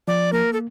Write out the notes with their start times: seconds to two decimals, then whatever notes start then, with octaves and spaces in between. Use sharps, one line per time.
0.08 F3 D5
0.33 A#3 A#4
0.53 A4